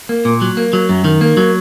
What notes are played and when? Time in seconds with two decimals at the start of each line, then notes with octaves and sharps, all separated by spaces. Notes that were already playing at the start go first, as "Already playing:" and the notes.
0.09 A#3
0.25 A#2
0.42 F#3
0.57 A#3
0.73 F#3
0.89 F#2
1.05 D#3
1.21 A#3
1.37 F#3